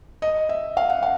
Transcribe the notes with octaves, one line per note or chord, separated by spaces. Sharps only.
D#5
E5
F5
F#5
F5